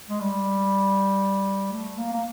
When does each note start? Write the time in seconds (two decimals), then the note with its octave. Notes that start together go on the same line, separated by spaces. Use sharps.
0.09 G#3
0.20 G3
1.71 A3
1.97 A#3
2.12 A#3